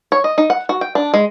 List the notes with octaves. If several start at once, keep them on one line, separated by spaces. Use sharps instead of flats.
C#5
D#5
D#4
F#5
F#4
G5
D4
G#3